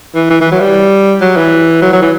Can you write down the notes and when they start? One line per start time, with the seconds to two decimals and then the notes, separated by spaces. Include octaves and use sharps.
0.16 E3
0.30 E3
0.41 E3
0.51 F#3
0.60 G3
1.21 F#3
1.37 E3
1.82 F#3
1.92 F#3
2.02 E3